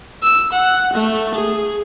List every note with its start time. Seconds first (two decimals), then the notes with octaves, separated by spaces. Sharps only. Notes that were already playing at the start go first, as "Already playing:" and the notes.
0.23 E6
0.53 F#5
0.93 A3
1.35 G#4